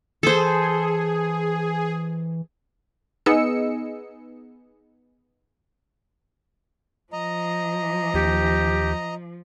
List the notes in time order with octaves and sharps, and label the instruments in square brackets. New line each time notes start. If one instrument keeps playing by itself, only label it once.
[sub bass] E3 [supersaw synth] G#4 [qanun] A4 C5
[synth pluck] B3 D#4 G#4 D#5 E6 C#7
[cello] F3 [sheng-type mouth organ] D#5 A#5
[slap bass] D#2 [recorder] G4